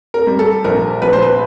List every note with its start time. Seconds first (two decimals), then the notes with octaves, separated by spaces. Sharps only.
0.14 A#4
0.27 G3
0.39 A4
0.64 A#1 A#4
1.02 A#1 B4
1.13 C5
1.23 B4